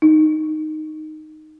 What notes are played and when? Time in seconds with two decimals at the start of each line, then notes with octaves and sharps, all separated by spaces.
0.02 D#4